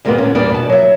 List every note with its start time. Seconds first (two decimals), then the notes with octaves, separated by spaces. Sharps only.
0.05 D2 G2 A#2 G#3 A#3 B3
0.18 D3 C#4
0.35 E2 G3 A#3 B3 D4
0.50 B2 A5
0.69 F#3 E5